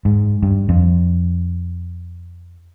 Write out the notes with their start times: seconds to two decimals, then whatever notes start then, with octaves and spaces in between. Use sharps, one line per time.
0.05 G#2
0.43 G2
0.69 F2